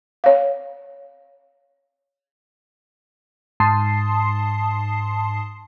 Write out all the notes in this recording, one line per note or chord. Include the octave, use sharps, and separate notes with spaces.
C#5 F5
G#2 A5 C6 D#6 C7